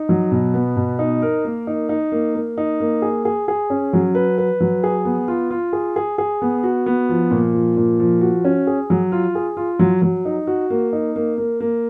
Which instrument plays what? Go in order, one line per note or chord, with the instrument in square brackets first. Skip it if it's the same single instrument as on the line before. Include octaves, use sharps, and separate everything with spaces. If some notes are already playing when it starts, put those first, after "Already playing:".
Already playing: [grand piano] D#4
F#3
B2
B3
B2
D#4
A#4
A#3
D#4
D#4
A#3
A#3
D#4
A#3
G#4
G#4
G#4
C#4
F#3
B4
B4
F#3
G#4
B3
F4
F4
G#4
G#4
G#4
B3
F#4
B3
F3
A#2
F3
A#2
F3
F#4
C#4
G#4
F#3
F4
G#4
F4
F#3
F#3
D#4
F#4
A#3
D#4
A#3
A#3
A#3